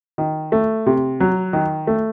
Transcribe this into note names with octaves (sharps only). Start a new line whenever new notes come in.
D#3
A3
C3
F#3
D#3
A3